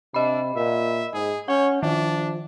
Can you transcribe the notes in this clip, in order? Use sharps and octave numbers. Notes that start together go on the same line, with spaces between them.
C3 D4 D#5 B5
A#2 E5
G#2 G#4
C#4 C#5 F#5
D#3 F3 D4